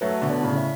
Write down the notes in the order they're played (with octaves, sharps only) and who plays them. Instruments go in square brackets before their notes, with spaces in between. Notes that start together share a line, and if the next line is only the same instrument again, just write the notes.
[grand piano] F#3 A3 [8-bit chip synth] B4
[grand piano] B2 D3
[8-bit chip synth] D5
[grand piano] A2 C#3
[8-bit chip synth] E5